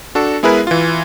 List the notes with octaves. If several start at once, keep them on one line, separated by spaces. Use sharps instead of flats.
D4 F#4 A4
G#3 B3 E4 G#4 A#4 B4
E3 F4